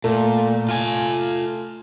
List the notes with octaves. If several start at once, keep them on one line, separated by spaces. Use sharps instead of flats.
A#2 A3
F4 G#5